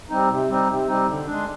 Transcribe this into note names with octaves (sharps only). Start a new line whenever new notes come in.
G3 C4 D#4
C3
G3 C4 D#4
C3
G3 C4 D#4
D3
G#3 D4